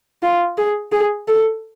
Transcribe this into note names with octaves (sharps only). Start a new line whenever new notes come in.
F4
G#4
G#4
A4